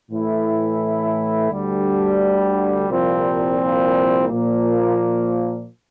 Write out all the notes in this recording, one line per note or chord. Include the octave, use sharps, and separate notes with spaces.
A2 E3 A3 E4
D2 D3 G3 D4
C2 A#2 F3 C4
A#2 F3 A#3